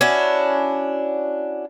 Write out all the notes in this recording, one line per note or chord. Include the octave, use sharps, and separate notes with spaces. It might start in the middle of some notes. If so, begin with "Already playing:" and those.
C#4 D4 E4 F#4